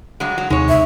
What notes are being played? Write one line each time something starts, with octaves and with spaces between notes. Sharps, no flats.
G2 F#3 G#3
F#3
D#2 C3 G#3 D#4 C#5
E5